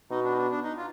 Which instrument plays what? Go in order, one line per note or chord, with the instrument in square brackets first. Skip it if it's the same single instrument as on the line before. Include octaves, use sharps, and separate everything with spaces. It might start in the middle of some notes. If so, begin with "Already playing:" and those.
[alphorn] B2 [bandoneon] D#4
[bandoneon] D4
D#4
D4
D4
D#4
F4